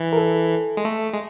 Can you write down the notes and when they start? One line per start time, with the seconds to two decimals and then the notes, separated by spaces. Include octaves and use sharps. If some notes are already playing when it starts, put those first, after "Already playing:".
Already playing: E3
0.13 A#4
0.17 A4
0.77 G#3
0.85 A3
1.13 G#3